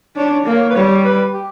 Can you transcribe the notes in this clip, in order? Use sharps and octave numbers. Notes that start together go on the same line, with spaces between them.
D4 C#5
C#5
A#3
C#5
B4
G3 C#5
B4
G4